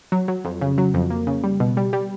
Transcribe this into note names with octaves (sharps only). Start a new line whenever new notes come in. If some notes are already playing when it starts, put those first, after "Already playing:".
F#3
F#3
F2
C#3
F#3
F2
A#3
C#3
G3
B2
G3
G3